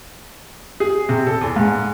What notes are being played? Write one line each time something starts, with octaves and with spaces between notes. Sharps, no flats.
G#4
C3
A4
E2
G#2